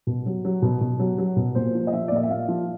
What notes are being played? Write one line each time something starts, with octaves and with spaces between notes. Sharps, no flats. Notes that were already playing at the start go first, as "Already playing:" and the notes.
B2
F#3
F#3
B2
B2
F#3
F#3
B2
A#2 C5
F3
D#5
F3 E5
D5
A#2 D#5
E5
A#2 F5
F3